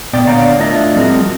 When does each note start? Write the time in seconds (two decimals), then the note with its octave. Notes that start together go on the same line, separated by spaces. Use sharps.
0.13 A#2 B3 D5 G5
0.27 D3 B3 C#5 D5 F5 A#5
0.59 A2 D4 F4 A#4 D#5 E5
0.96 F3 G3 C4 F#4 G#4 A#4